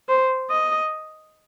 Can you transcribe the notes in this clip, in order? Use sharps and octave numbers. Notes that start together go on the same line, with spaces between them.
C5
D#5